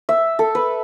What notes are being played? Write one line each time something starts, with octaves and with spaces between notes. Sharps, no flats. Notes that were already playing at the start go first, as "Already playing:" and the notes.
E5
A4
B4